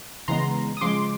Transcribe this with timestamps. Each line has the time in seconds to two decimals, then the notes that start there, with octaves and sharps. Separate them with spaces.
0.28 C#3 E3 G#3 B3 A#5 C6
0.77 D#6
0.81 C#3 F3 G#3 C6 D6